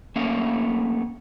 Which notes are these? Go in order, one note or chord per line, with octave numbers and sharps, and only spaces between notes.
A3 A#3 C#4 E5 F5